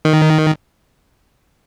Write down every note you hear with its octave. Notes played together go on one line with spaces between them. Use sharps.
D#3